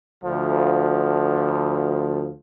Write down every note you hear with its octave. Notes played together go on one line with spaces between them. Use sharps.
D2 F3